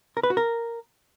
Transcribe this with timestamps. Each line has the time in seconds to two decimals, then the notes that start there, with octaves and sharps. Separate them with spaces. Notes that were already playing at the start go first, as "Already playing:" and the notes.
0.17 A#4
0.23 B4
0.30 F#4
0.37 A#4